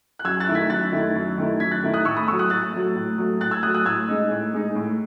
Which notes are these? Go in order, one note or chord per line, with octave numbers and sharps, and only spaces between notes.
F#6
F#2 E6 G#6
F#6 A6
D#3 A3 E4
G#6 B6
F#2 F#6 A6
D#3 A3 E4
F#2
D#3 A3 E4
F#2 G#6 B6
F#6 A6
D#3 A3 E4
D#6 F#6
A2 C#6 E6
B5 D#6
F#3 A3 C#6 E6
D#6 F#6
A2 F#6 A6
F#3 A3
A2
F#3 A3
A2 F#6 A6
E6 G#6
F#3 A3 D#6 F#6
D#6 F#6
A2 E6 G#6
G#3 D#4
A2
G#3 D#4
A2